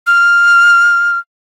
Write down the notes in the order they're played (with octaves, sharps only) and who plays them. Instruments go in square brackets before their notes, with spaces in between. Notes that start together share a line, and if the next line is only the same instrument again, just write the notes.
[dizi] F6